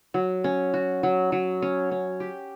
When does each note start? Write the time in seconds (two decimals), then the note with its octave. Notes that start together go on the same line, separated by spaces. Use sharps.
0.14 F#3
0.44 C#4
0.74 F#4
1.03 F#3
1.32 F#3
1.62 C#4
1.91 C#4
2.20 G4